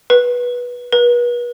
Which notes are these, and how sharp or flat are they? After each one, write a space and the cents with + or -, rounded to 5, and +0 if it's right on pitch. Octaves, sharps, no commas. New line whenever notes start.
B4 -15
B4 -40